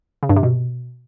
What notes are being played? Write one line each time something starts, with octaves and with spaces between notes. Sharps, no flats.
C#3
G2
C3
B2